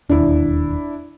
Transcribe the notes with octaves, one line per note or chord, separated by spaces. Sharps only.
E1 D#2 D4 E4